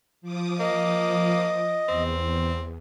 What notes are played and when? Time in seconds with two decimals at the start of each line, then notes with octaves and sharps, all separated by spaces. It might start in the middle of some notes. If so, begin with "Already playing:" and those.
0.22 F3 D6 D#6
0.60 A#3 D#5
1.89 E2 C4